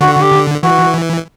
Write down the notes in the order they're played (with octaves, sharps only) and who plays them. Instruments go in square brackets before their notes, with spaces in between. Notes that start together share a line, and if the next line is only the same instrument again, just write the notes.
[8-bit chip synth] D3 [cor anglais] F#4
[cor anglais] F#4
G4
[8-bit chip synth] E3 [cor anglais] F#4